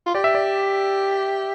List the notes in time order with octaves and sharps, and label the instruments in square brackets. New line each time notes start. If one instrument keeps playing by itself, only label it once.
[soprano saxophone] F4
[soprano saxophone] G4 [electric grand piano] D5
[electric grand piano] E5
D5